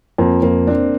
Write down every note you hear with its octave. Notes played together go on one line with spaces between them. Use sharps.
F2 A#3
F2 A#3
C4 D4